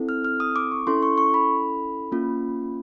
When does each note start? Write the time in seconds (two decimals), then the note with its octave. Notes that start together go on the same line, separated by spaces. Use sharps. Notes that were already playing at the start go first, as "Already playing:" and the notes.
Already playing: C4 E4 A4
0.09 F6
0.25 F6
0.40 D#6
0.56 D6
0.71 C#6
0.87 C#4 E4 A4 C6
1.03 C#6
1.18 C#6
1.34 B5
2.12 A#3 C#4 F4